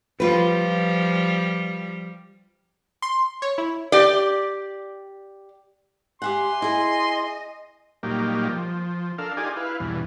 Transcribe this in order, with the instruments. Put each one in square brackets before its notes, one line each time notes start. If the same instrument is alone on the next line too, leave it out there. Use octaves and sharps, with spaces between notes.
[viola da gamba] F3 G3 [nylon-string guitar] F4 B4
[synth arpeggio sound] C6
C#5
E4
[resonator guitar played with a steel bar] G4 D5
[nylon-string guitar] G4 E5 F#5 [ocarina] G#5 [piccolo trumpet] C6
[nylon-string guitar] E4 G#4 [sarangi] D#5
[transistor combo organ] A#2 F#3 G3 A#3 D#4 G4
F3
D4 A4 A#4 F5
D#4 F4 G4 G#4 D5 G#5
E4 B4 F5
E2 G2 B2 E3